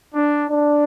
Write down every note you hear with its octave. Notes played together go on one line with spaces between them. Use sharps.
D4
D4